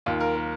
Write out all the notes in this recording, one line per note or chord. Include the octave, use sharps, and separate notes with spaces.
D#2 F4
A#4
A#4